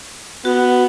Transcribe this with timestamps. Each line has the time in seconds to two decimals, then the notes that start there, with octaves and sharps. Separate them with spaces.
0.45 B3 F#4